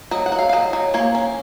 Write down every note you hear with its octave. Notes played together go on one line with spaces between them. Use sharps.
F#3 D#5
F#5
F#3
F5
F5
F#3 D#5
F#3
A#3 C#5
C#4